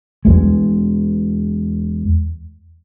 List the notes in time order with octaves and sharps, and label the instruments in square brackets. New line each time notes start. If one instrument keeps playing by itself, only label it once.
[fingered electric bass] E2 G#3